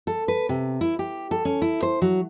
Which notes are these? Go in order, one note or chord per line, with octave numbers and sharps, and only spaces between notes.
A4
B4
C3
E4
G4
A4
C#4
E4
C5
F#3